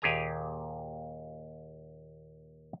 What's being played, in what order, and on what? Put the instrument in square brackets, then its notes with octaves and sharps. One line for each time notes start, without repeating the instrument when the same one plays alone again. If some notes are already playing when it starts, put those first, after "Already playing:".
[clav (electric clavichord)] D#2 A#2 G4 G#4 G#5 A#5